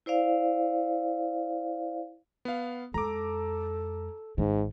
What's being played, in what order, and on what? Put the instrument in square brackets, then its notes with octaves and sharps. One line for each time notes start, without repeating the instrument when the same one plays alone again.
[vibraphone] E4 C5 D5 F5
[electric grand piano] B3 F5
[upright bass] F2 G#3 [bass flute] A4 [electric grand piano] A#5 D6
[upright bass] G#1 D#3 [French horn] G#2